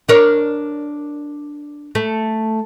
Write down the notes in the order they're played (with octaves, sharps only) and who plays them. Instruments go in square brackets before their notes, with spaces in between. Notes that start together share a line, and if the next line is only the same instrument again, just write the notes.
[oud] D4 A#4 C#5
A3